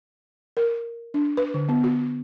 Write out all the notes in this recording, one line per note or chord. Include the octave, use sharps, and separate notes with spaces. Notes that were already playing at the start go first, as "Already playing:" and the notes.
A#4
D4
B4
D3
B3
F#4